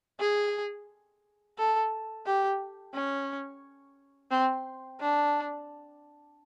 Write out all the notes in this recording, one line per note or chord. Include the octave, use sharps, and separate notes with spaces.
G#4
A4
G4
C#4
C4
D4